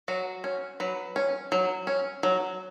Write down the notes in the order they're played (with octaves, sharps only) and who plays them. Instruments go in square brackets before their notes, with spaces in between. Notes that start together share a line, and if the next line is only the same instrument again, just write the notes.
[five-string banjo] F#3 F#4
C#4
F#3 B4
C#4
F#3
C#4
F#3